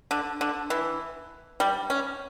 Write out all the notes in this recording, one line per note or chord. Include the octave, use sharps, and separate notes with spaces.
D3
D3
E3
G3
C#4